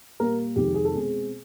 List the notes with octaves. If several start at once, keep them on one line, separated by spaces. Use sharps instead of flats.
A#2 G3 A#3 A#4
F2 C3 D#3 G#3 G4
G#4
A4
B2 G#3 C4 G#4